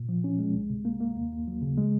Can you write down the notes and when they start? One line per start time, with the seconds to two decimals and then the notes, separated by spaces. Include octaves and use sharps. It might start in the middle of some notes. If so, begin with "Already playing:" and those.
Already playing: A#2
0.09 F3
0.24 C#4
0.39 G#3
0.54 C2
0.70 C3
0.85 A#3
1.01 A#3
1.16 D#2
1.32 D#2
1.48 F#3
1.62 C#3
1.78 G#3